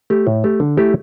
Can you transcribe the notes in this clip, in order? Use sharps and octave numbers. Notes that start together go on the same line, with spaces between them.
A3 G4
A2
A3 G4
D3
A3 E4 G4